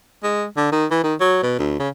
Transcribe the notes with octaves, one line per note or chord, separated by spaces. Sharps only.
G#3
D3
D#3
E3
D#3
F#3
B2
D2
C#3